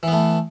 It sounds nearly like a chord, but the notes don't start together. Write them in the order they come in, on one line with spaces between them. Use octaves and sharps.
E3 B3 A3